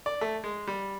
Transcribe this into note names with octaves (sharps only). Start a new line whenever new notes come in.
D5
A3
G#3
G3